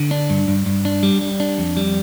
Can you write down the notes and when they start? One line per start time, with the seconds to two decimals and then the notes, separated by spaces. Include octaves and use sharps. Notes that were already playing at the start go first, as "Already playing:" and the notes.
Already playing: D3
0.11 D4
0.30 G2
0.48 G2
0.66 G2
0.85 D4
1.03 G3
1.21 G3
1.40 D4
1.58 F2
1.77 G3